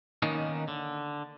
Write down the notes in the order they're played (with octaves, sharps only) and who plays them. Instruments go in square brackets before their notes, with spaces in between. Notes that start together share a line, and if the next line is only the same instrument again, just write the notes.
[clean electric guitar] D#3 A#3 B3 C#4 D#4
D3